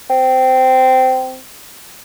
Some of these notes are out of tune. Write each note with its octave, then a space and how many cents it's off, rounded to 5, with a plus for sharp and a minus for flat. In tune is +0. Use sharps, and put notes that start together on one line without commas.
C4 -15